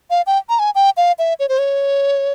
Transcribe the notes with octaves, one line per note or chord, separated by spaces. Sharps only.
F5
G5
A#5
G#5
G5
F5
E5
C#5
C5
C#5